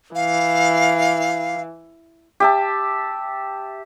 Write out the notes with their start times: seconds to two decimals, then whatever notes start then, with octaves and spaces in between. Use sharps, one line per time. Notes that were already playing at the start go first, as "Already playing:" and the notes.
0.15 E3 F5
2.40 G4 E5 A5